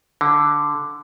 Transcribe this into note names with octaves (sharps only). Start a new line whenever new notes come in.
D3